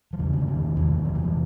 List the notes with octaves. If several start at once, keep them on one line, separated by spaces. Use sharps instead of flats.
F3
E2 C#3 E3
D3
D#3
E2 C3
E3
F3
E3